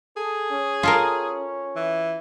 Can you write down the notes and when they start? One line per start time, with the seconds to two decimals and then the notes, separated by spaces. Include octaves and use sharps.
0.17 G#4 A4
0.51 C#4
0.83 F4 A4 A#4
1.76 E3